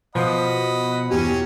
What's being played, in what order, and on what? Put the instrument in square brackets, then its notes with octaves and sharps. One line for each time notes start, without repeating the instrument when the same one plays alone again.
[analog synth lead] B2 [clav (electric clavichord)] F3 [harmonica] D#5 F#5 B5
[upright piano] E2 G4 [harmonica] F#3 C#4